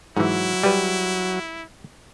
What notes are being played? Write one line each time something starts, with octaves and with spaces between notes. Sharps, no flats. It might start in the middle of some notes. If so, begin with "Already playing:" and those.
G#2 E3 F#3 E4
G3 B4